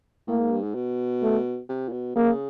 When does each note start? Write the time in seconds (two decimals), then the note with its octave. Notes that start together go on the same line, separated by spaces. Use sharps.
0.28 A2 A#3
0.39 G#2
0.51 G2
0.63 G#2
0.75 B2
1.23 A3
1.69 C3
1.89 A#2
1.92 B2
2.16 C#3 A#3